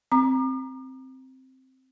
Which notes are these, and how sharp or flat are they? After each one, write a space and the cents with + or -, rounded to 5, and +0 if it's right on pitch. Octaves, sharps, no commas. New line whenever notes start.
C4 +0 A#5 +15 D6 +45